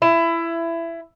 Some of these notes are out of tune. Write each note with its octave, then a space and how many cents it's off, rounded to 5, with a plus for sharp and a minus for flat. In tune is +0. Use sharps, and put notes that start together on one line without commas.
E4 +20